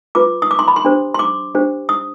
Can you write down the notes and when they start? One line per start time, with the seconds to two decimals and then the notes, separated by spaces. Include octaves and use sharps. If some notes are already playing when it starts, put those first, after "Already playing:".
0.15 F4 B4 D6
0.42 D#6
0.51 D6
0.59 C6
0.68 B5
0.76 C6
0.85 D4 G4 C5
1.14 C6
1.19 D6
1.55 D4 G4 C5
1.89 D#6